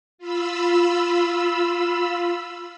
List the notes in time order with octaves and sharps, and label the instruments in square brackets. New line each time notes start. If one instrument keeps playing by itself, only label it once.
[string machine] F4 B5 E6